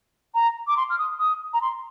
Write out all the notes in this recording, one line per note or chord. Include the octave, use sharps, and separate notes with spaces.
A#5
D6
C6
F6
D#6
D#6
A#5
C6